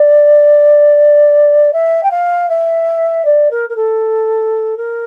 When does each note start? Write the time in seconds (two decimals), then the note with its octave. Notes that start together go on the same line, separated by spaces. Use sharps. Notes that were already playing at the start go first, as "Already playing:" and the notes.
Already playing: D5
1.73 E5
2.03 G5
2.11 F5
2.49 E5
3.25 D5
3.51 A#4
3.69 A#4
3.76 A4
4.77 A#4